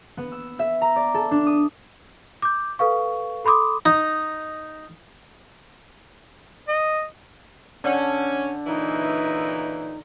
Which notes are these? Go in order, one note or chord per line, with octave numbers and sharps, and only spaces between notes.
B3
E6
E5
A#5
D5
A4
D4
D#6
D6 G6
A4 B4 F5 C#6
A4 B5 C6 D6 D#6
D#4
D#5
D3 C#4
A#2 C#3 E3 D#4